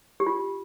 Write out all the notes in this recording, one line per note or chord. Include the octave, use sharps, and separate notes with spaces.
G4
F4